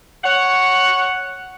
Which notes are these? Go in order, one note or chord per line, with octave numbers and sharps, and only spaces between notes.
C#5 F#5